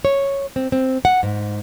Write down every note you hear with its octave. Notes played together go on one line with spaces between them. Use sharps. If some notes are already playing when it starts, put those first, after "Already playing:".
C#5
C4
C4
F#5
G#2